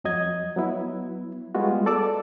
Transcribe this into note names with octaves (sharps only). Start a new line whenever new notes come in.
F2 F#3 D#5 G#6
F#3 B3 E4
G3 G#3 B3 F4 F#4
A4 D5 D6 E6